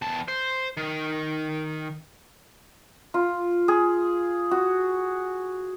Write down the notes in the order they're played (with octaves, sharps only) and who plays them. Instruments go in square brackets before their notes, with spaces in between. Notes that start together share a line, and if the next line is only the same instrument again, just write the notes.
[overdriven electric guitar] E2 A5
C5
D#3
[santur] F4
G#4
F#4